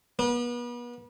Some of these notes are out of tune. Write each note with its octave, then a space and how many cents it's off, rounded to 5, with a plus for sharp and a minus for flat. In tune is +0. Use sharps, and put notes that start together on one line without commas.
B3 -35